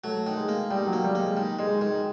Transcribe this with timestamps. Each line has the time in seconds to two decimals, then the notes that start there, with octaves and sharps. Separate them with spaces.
0.04 F#3 A3
0.27 D#3
0.37 G#3
0.49 A#3
0.71 D#3 G3
0.87 F#3
0.93 A#3
1.04 G3
1.15 A#3
1.20 G#3
1.37 D#3
1.59 D#3 G#3
1.81 D#3 G#3